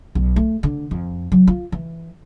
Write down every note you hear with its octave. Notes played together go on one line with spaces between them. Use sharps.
B1
A3
D3
F2
F#3
F4
E3